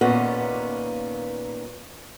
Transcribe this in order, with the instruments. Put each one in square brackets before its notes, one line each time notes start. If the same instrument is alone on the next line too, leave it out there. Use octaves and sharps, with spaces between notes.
[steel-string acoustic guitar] D#2 A#2 B3 C#4